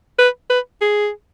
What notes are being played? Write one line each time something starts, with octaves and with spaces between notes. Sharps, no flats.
B4
B4
G#4